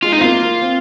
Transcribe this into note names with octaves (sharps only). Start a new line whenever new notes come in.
G#3 F4
D#4
C4
A#3 F4
A#3
C4